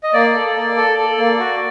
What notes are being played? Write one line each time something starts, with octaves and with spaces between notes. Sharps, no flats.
D#5
A#3 D5
A4
A#3
A4
A4
A#3
F#4